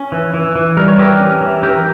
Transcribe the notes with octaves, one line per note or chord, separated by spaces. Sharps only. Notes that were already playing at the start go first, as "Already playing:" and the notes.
Already playing: C#4
E3
E3
E3
G3 A#4
C#5
E3 G4 A#4
C#4
E3
E3 G4 A#4